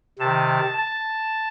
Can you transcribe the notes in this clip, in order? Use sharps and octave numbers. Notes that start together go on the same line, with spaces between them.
C3 D#3 A5
A5